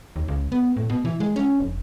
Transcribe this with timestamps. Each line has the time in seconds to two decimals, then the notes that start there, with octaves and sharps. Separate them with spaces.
0.16 D#2
0.28 C#2
0.52 B3
0.77 A2
0.90 B2
1.05 E3
1.20 G#3
1.36 C#4
1.60 F1